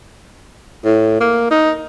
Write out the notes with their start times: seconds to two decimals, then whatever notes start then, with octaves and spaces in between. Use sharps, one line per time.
0.85 A2
1.20 A#3
1.51 D#4